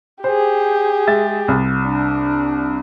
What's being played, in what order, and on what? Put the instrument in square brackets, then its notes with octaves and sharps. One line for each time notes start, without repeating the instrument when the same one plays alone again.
[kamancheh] G4 G#4 [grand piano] C5
[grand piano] G#3 E5 A6
C2
[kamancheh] D4